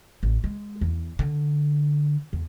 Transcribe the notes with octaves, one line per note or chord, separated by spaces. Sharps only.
A1
G#3
E2
D3
E2